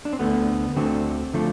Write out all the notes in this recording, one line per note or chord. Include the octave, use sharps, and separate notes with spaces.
D4
C4
D2 D3 A3 B3
D2 D3 A3 C4
D3 F3 A3